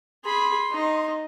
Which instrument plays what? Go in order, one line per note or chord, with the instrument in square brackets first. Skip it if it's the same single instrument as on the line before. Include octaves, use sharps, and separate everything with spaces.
[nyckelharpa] G#4 B5 [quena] C6
[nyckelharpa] D#4 D#5